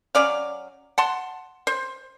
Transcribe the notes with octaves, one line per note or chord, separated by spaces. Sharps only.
F#3 C#4 D5 F5
F#5 A5 C6
C5